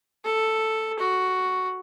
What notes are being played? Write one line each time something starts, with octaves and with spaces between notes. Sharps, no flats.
A4
F#4